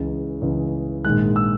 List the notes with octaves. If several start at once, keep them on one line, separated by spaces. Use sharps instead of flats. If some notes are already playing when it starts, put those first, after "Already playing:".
Already playing: C#2 C#3 E3
C#2 C#3 E3
A#1 G#2 D#3 G#3 F#6
E6